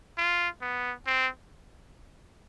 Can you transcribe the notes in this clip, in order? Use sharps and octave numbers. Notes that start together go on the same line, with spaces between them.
F4
B3
C4